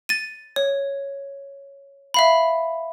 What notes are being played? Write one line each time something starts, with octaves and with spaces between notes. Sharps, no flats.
A6 D#7
C#5
E5 F5 B5